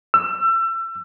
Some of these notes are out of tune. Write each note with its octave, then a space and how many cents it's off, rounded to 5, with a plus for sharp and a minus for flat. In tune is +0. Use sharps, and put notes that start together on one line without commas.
E6 +30